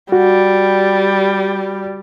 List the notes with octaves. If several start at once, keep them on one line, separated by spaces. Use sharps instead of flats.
G3 F#4